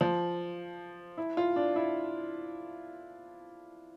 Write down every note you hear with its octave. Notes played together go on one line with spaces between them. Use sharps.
F3
E4
F4
D4
E4